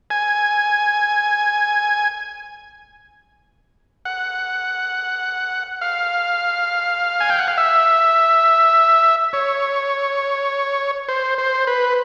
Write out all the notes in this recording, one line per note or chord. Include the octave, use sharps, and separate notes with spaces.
G#5
F#5
F5
G#5
G5
F#5
F5
E5
C#5
C5
C5
B4